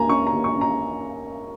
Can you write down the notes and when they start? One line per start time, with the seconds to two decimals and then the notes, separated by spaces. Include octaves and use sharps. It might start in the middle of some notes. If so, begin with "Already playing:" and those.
Already playing: D#2 A#3 G#5 A#5
0.09 C#4 C#6
0.27 A#5
0.33 D#2
0.44 C#6
0.55 C#4
0.61 A#5